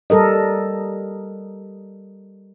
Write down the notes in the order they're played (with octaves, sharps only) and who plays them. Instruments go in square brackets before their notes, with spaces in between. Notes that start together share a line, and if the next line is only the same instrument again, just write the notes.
[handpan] G3 A4 A#4 D#5